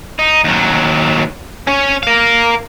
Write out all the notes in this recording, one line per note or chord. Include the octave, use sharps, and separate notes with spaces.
D#4
D#2 F#3
C#4 C#5
A#4 F5